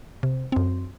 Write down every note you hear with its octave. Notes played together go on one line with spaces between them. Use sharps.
C3
F#2 C4